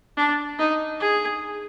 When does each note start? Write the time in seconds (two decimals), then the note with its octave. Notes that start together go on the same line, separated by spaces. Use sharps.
0.17 D4
0.59 D#4
1.00 G#4